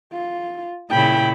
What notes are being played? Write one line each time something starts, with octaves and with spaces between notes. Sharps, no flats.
F4
A#2 C#3 E4 G5 B5